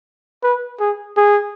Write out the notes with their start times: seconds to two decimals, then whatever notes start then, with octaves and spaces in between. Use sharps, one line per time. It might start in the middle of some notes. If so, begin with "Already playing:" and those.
0.43 B4
0.80 G#4
1.17 G#4